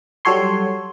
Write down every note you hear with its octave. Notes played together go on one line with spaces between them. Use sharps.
F#3 G3 F#4 A4 C#5 C6